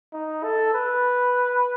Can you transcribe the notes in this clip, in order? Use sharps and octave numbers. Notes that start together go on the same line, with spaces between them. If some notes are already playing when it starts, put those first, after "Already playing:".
D#4
A4
B4